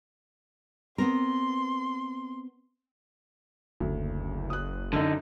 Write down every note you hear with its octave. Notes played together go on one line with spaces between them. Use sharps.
B3 C4 A#4 C6
F#1 D2
D#6 F#6
F#2 D3 D#4 E6